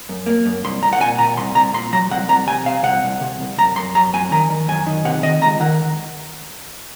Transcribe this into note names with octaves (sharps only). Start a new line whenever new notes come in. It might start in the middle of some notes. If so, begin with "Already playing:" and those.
F#2
A#3
F#2
C2 C6
C2 A#5
F#5
A#2 G#5
A#2 A#5
C2 C6
C2 A#5
A#2 C6
F#3 A#5
C2 F#5
C2 A#5
C3 G#5
C3 F5
C2 F#5
C2
C3
C2
F#2 A#5
F#2 C6
F#3 A#5
F#2 G#5
D#3 A#5
D#3
F#2 G#5
D#3
C3 F#5
D#3 D#5
C#2 A#5
D#3 F#5